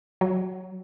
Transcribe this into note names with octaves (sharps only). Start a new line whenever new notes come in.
F#3